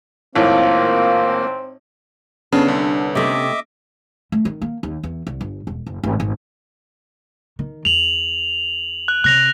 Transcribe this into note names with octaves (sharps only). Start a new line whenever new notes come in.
G#1 A2 A#3 C4 F4
C#3 B3 C#4 D4 A4
C2 D3
C3 A3 D#5 E5 D6
A3
D#3
A#3
D#2
E2
C2
G1
E1
F#1
G#1
G#1
D#3
E2 F7 F#7
F#6
C3 F#6 A#6 F7